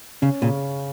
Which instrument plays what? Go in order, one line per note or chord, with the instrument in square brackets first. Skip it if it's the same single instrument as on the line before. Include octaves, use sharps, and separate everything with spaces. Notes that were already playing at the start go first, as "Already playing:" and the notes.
[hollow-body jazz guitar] C#3 [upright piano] C#4
[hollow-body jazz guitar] A#2 [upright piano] C#3